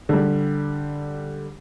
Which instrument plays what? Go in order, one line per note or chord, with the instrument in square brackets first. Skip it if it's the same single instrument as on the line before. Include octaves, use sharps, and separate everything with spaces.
[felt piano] D3 G3